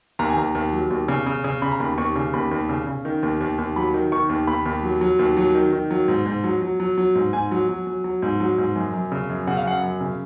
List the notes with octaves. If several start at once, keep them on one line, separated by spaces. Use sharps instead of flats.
D#2 A#5
G#5
D#2 A#5
D#2
F#3
D#2
C#3
C#3
C#3
C#3 B5
A#5
D#2 B5
D#2 C#6
C#3
D#2 B5
D#2
C#3
C#3
D#3
D#2
D#2
D#2
F#3 B5
D#3
D#3 C#6
D#2
D#2 B5
D#2
F#3
F#3
D#2
F#3
D#3
D#3
F#3
G#2
G#2
F#3
F#3
F#3
F#3
G#2
G#2 G#5
F#3
F#3
F#3
F#3
G#2
F#3
G#2
F#2
F#2
C#3
F#2
C#3 F#5
F5
F#2 F#5
F#2
C#3